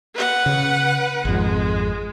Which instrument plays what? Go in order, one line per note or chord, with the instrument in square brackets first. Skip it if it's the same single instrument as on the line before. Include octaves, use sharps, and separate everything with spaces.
[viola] B4 F#5
[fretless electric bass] C#3
[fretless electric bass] G#1 F2 [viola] G#3